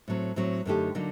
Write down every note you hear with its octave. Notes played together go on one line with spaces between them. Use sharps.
A2 F#3 C4
A2 F#3 C4
F#2 D3 A3 D#4 G4
D3 F#3 A#3 D#4